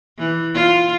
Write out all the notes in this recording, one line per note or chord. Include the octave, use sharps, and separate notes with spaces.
E3
F4